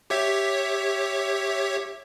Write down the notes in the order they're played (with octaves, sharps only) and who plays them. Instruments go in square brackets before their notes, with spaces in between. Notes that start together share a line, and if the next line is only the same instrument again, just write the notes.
[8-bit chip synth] G4 C#5 E5